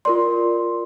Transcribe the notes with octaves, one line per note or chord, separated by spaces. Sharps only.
F4 A#4 D5 C6